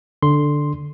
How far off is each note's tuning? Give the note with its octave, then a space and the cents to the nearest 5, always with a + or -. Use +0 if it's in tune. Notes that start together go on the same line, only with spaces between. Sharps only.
D3 +0 C6 +0